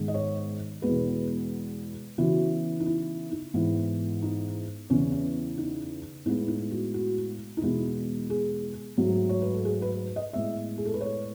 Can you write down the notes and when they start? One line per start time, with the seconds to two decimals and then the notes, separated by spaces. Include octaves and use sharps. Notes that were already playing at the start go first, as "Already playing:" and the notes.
Already playing: G#2 D#3 G#3 B3
0.08 D#5
0.14 C#5
0.82 E2 B2 G#3 B3 B4
2.18 C#3 E3 B3 F#4
2.80 D#4
2.86 E4
3.31 D#4
3.54 G#2 E3 B3 E4
4.22 D#4
4.90 E2 C#3 E3 B3 C#4
5.12 C#4
5.58 D#4
6.26 A2 G#3 B3 D#4
6.48 D#4
6.71 F#4
6.94 F#4
7.57 D#4
7.61 E2 B2 G#3 B3 E4
8.30 G#4
8.97 G#2 F#3 A3
9.29 C#5
9.42 B4
9.53 A4
9.65 G#4
9.82 B4
10.16 D#5
10.33 A2 G#3 B3 E5
10.78 G#4
10.85 A4
10.94 B4
11.01 C#5